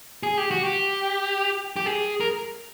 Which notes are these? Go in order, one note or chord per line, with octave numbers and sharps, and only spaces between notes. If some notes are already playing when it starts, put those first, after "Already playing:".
G#4
G4
F#4
G4
G4
G#4
A#4